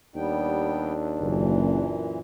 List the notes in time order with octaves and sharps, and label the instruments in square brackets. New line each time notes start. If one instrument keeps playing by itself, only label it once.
[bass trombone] D#2 [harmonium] G3 B3 G5 [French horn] D4
[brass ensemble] F#1 [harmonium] F#2 A#2 E3